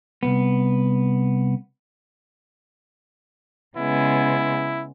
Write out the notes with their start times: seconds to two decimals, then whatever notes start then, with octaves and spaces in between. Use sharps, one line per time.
0.23 C2 F#2 B3
3.77 C#3 G#3 B3 E4